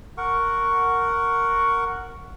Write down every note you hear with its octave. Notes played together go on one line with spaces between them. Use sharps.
A#4 F#5 C#6